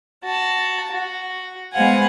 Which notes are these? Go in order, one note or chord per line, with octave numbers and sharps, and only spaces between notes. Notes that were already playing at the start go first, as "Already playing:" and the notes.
F#4 A5
F#4
G#3 B3 C5 F5 F#5 G#5